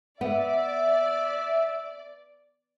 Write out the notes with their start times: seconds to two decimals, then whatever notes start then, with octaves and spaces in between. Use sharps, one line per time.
0.21 B3 D5 E5